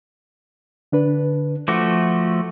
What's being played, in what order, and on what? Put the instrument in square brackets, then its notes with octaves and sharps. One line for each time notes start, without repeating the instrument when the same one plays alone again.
[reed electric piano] D3 D4 B4
[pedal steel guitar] F3 A3 F#4 [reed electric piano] D6